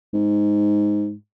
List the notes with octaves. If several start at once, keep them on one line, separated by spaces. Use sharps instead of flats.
G#2